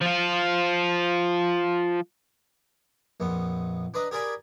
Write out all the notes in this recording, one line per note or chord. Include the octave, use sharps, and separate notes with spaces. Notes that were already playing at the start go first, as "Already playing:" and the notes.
F3 F4
A#1 F2 B3
D4 B4 D#5 A#5
G4 G#4 A#4 D5 G#5 B5